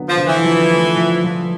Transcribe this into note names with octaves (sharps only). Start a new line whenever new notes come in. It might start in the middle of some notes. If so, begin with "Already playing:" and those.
Already playing: D3 F#3 B3
F3
D3
E3
F3
A3
F3
F3